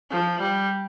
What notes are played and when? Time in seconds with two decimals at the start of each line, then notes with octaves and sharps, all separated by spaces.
0.12 F3
0.41 G3